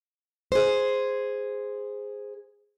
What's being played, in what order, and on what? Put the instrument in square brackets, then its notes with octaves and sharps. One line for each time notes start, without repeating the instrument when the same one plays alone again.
[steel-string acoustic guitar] G#4 C5